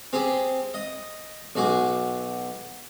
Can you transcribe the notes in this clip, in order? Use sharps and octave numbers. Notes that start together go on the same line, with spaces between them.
C4 G4 G#4
D#5
B1 F#4 G#4 D6